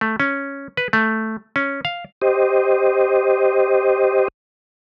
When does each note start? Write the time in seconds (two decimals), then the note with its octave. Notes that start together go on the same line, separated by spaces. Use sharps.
0.01 A3
0.20 C#4
0.77 B4
0.93 A3
1.56 C#4
1.85 F5
2.22 G4 C5 D#5